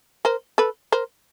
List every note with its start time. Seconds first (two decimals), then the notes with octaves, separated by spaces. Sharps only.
0.25 A#4 C5
0.58 A4 B4
0.92 A#4 C5